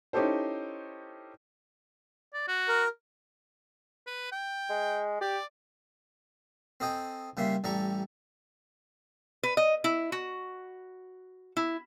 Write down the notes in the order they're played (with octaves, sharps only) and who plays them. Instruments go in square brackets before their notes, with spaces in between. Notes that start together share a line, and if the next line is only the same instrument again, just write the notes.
[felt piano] C#4 D#4 E4 G4 A4 C5
[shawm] D5
F#4
[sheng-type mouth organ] A#4
[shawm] B4
G5
[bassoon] G#3
[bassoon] G4 [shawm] D5
[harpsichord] C4 A4 D#5 G5 G#5
C#3 G3 A#3 E5 C6
A1 G3 A4 D5 A#5 C#6
[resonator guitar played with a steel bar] B4
D#5
E4
F#4
E4